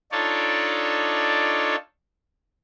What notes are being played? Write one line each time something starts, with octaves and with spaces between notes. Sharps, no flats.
D4 D#4 F4 A4 C#5 D5